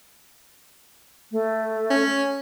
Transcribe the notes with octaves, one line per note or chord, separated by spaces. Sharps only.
A3
C#4